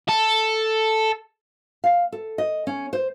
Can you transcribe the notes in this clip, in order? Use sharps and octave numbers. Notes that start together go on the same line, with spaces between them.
A4
F5
A4
D#5
C#4
C5